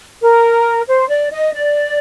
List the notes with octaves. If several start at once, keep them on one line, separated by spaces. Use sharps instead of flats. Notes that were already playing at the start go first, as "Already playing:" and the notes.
A#4
C5
D5
D#5
D5